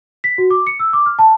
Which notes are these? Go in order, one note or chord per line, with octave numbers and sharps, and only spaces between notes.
B6
F#4
D6
C#7
E6
D6
F6
A5